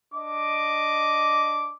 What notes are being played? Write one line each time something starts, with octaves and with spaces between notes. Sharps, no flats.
D4 D#5 D6